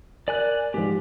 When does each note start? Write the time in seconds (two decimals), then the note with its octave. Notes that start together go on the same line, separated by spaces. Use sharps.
0.28 A#4 D5 G#5 F#6
0.74 G#2 F3 G4